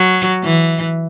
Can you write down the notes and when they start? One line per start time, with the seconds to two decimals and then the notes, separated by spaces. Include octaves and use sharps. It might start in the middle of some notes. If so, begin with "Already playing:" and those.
Already playing: F#3
0.43 E3